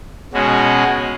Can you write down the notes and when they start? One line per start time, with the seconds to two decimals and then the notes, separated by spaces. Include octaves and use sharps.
0.33 B2 G#3 C#4 F#4